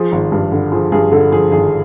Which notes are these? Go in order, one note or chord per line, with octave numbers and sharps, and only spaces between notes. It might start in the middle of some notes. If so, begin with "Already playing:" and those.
Already playing: F3 G#4
G#1
G2
D3
F3 G#4
G2 G#4
D3 A4
F3 G#4
G#1 G#4